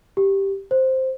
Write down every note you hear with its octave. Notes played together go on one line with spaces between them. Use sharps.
G4
C5